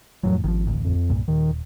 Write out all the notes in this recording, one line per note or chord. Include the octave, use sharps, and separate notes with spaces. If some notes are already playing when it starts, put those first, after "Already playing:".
F2 A2 E3 F#3
G#1 D#3 F3
A1 D2
F2
C2 G2 A#2
D#1 D#3